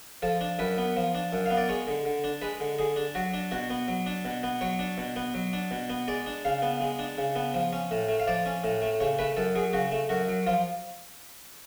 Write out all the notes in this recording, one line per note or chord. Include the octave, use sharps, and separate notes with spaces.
F3 A4
D4
F#2 B4
B3
F3
D4
F#2
B3 F5
D5
G#3 C#5
D3
D3
D4
G#3 B4
D3
D3 G#4
D4
F#3 F#4
D4
B2 F#4
B3
F#3
D4
B2
B3
F#3 C#5
D4
B2
B3
F#3
D4
B2
B3
G#3 D5
D4
C#3 F5
B3
G#3
D4
C#3
B3
F3
C#4
A2
A3
F5
F3 D5
C#4
A2
A3
C#3 C#5
A3 B4
F#2 A4
F#3 G#4
C#3 F#4
A3
F#2 F#4
F#3
F3 F4